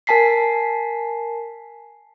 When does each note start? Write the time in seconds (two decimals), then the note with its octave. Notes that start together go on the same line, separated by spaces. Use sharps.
0.07 A#4 G#5 A5 B6 C7